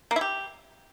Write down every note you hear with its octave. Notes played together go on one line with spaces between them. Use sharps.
A#3
E4
G4